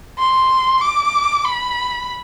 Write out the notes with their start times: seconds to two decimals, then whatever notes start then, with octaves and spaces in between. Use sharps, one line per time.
0.18 C6
0.81 D6
1.44 B5